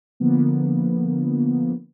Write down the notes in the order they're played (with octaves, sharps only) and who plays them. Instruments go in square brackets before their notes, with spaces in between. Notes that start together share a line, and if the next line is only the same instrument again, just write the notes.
[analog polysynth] D3 F3 A#3 B3